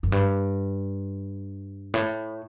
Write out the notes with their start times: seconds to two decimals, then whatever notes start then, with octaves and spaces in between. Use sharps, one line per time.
0.03 F#2
0.12 G2
1.94 A2